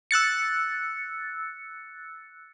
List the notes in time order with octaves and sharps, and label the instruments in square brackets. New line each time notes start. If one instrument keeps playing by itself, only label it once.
[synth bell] E6 F#6 A6 C#7